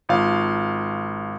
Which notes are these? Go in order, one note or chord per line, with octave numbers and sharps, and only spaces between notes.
G#1 F4 F5